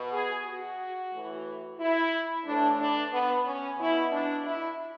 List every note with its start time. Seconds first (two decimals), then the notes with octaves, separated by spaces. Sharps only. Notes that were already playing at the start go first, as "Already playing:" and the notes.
Already playing: B2
0.12 G#4
0.46 F#4
1.12 A2 E3
1.79 E4
2.45 A2 E3 D4
2.79 D4
3.12 B3
3.45 C#4
3.78 B2 E4
4.12 D4
4.44 E4